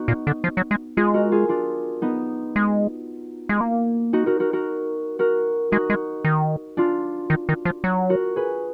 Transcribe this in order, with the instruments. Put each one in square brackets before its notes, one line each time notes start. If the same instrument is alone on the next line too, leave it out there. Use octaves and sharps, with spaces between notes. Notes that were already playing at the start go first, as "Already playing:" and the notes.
Already playing: [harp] B3 D#4 F#4
[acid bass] A#2
D3
F3
F#3
G#3
[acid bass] G#3 [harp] F4 G#4
[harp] F#4 A#4
F4 G#4
D4 F4
B3 D#4
[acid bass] G#3
G#3
A#3
[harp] D#4 F#4
F#4 A#4
F#4 A#4
F#4 A#4
F#4 A#4
[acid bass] G#3 [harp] D#4 F#4
[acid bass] G#3
D#3
[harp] D4 F4
[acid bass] D#3
D#3
F3
F#3
[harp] F#4 A#4
G#4 B4